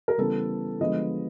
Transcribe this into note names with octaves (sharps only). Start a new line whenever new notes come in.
A#4
C#3 E3 G3 B3 A4
D3 F3 G#3 B3 D#5